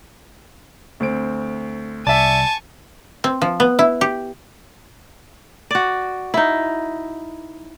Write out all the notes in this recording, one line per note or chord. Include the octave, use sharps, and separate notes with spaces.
D2 C4 D7
C2 D5 E5 G#5 A5 C#6
C4
F3
B3
E4
G4
F#4 D5
D#4 E4